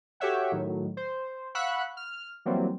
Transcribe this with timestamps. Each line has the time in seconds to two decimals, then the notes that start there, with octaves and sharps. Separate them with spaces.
0.20 F#4 G4 A4 C#5 E5 F#5
0.52 A2 D#3 F#3
0.97 C5
1.55 F5 F#5 B5 C#6 E6 F#6
1.97 F6
2.45 E3 F#3 G3 A#3 C4